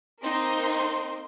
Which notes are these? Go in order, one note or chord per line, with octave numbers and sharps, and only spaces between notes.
A#3 C4 D#4 C6